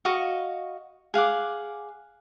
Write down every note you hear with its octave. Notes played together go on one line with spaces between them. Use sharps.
F#4 D#5 F5 C#6
G#4 F5 F#5 D6